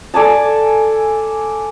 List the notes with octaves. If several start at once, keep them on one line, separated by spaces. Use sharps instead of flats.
A4 D5 G#5 A5